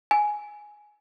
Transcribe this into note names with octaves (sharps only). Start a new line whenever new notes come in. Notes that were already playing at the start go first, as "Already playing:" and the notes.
G#5